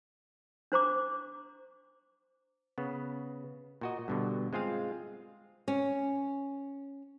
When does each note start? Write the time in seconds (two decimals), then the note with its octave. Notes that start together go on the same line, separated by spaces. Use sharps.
0.72 D4 C5 A#5 D6
2.78 C#3 B3
3.81 A#2 F#4 D#5
4.08 G2 B2 D3
4.53 G#3 C4 F4 G#4 F5
5.68 C#4